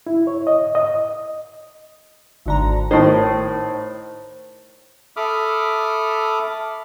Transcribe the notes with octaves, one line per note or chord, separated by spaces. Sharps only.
E4
C#5
D#5
D#5
G#1 D3 A#5
A2 D#3 C5 C7
A4 E5 B5 D6 D#6 F6